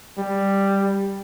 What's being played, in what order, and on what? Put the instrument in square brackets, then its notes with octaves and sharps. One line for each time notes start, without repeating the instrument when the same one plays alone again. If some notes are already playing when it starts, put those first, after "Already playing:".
[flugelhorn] G3